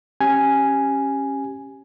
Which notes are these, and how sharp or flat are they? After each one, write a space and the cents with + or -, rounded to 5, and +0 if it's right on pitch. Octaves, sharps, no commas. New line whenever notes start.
C#4 -20 G4 +0 G#5 +0